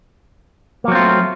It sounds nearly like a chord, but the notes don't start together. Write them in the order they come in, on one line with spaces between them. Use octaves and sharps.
A#3 F#3 C4 F4 A3